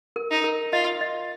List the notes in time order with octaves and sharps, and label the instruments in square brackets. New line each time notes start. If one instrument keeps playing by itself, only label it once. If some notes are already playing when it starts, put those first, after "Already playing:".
[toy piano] A#4
[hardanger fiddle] D#4
[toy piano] A#4
[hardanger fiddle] F4 [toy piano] D#5
[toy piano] D#5